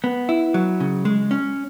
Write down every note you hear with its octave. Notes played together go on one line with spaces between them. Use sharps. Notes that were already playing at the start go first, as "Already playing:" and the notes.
B3
E4
F#3
C#3
G#3
C#4